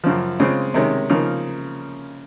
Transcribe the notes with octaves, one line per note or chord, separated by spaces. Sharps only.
F#2 C#3 F3
C#3 G#3 C4 F4
C3 D#3 G#3 C#4
C#3 F3 A#3 D#4